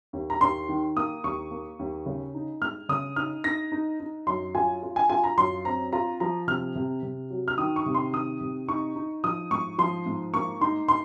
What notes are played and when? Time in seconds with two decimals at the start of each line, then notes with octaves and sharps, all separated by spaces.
0.13 D#2
0.30 A#5
0.41 D#2 C6
0.69 D#3
0.96 A#3 D#6
1.24 D#2 C#6
1.51 A#3
1.79 D#2
2.06 C#3
2.35 D#4
2.62 G#3 F6
2.89 C#3 D#6
3.16 D#4 F6
3.44 D#4 A#6
3.72 D#4
4.00 D#4
4.27 F#2 C6
4.55 F4 G#5
4.83 F4
4.96 G#5
5.10 F4 G#5
5.24 A#5
5.37 F#2 C6
5.65 C4 A#5
5.93 F4 A#5
6.20 F3 A#5
6.48 C3 F6
6.76 C3
7.02 C3
7.30 F#3
7.48 F6
7.58 D#3 D#6
7.76 C#6
7.86 C3
7.95 C6
8.13 D#3 D#6
8.41 C3
8.68 D#4 C#6
8.96 D#4
9.24 F3 D#6
9.51 G#2 C#6
9.78 F3 C6
10.06 G#2
10.34 A#3 C#6
10.61 D#4 C6
10.88 C6